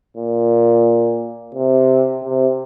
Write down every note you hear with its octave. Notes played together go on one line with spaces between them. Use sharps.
A#2
C3
C3